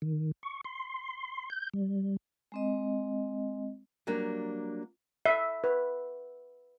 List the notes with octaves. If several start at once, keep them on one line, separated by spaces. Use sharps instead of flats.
D#3
C#6
C6
G6
G3
G#3 C4 D#5
F#3 G3 A#3 D4
E5
B4